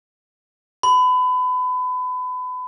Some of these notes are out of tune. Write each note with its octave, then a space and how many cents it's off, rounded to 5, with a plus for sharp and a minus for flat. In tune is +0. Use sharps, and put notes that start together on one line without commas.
B5 +30